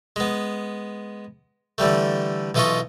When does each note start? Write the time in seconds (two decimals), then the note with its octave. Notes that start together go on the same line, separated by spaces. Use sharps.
0.16 G#3 B3
1.78 D3 E3 G3 A3
2.55 B1 E3 F4 A4 D#5 C#6